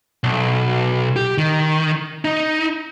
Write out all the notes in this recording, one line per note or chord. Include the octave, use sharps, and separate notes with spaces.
B1
G4
D#3
D#4